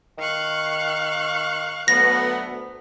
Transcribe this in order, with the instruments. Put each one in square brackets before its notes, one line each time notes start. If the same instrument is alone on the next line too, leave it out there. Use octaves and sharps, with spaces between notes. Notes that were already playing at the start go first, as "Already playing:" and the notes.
[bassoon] D#3 [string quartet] F5 C#6 F#6
[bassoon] D2 [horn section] F#3 A3 B3 [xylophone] A#6